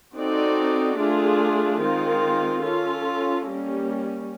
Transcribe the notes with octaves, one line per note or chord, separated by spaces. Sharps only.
C4 D#4 F#4 A4 D5
A3 D4 F4 G#4
D#3 G#3 C4 F4
C#4 F4 A4
G3 A#3 C#4